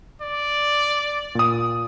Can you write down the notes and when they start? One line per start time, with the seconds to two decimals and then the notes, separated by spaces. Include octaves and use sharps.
0.22 D5
1.35 A#2 D#6